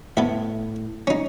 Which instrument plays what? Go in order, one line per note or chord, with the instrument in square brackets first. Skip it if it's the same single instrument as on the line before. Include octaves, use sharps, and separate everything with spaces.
[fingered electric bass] A2 [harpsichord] B3 E5
[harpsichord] C#4 D#4